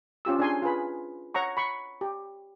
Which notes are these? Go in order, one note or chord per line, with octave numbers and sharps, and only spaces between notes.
C#4 F4 G4 E6
D4 G#4 C#5 G#5 C6
F4 G#4 B4 B5
C#5 F#5 A#5 C#6
B5 C#6
G4